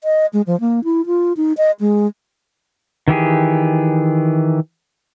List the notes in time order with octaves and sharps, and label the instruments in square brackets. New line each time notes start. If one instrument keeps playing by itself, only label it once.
[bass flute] D#5
G#3
F3
A#3
E4
F4
D#4
D#5
G#3
[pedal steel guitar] D#3 E3 G4 G#4